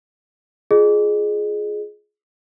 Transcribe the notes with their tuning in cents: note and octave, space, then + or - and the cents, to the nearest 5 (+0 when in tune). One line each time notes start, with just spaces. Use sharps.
F4 +0 G#4 +15 D#5 -35